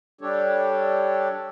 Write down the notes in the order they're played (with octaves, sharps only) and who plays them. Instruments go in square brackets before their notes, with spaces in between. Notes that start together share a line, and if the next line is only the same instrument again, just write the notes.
[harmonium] G3 D4 G4 A4 C#5